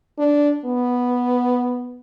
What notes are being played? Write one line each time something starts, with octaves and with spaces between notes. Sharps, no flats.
D4
B3